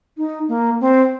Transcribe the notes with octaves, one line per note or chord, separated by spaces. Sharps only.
D#4
A#3
C4